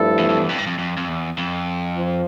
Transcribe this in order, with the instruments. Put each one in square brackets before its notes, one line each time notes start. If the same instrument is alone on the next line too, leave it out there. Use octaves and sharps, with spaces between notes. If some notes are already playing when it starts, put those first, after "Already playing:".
Already playing: [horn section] G2 F3 A3 E4 A4
[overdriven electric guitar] E2
F2
E2
F2
G2
F2
F2
F2
E2
F2
[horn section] F3